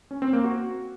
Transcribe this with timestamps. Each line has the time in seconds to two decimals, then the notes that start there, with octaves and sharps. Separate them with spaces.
0.11 C#4
0.22 C4
0.33 A#3
0.44 F#4